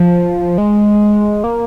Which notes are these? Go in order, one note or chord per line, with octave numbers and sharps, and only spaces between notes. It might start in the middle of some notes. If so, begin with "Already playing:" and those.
Already playing: F3
G#3
A#3